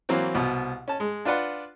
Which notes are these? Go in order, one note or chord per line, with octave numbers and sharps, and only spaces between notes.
E3 F#3 A#3 C4 C#5
C2 B2
C#4 A5
G#3
D4 F4 B4 D5 F#5 C6